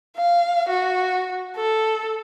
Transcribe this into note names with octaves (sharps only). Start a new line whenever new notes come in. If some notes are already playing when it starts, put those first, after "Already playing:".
F5
F#4
A4